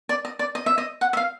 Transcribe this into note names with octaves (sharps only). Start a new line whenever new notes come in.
D5
D#5
D5
D#5
E5
D#5
F#5
E5
F5